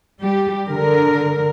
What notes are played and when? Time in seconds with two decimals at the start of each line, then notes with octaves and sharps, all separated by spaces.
0.21 G3 G4
0.68 D3 A#4